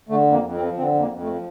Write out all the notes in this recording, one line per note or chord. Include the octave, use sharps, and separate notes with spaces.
D3 A3
F2
A#3
F2
C4
F3
D3 C4
F2
A#3
F2
A3
F3